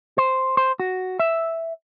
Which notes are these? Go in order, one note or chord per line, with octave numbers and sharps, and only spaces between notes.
C5
C5
F#4
E5